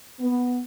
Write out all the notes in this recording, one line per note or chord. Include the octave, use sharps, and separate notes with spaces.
B3